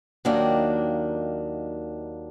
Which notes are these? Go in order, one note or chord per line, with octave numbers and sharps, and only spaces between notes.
D#2 D#3 F#3 A#3 D4